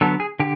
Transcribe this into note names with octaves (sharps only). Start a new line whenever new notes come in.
D3 F#3 B3 A4
G#4
D3 G4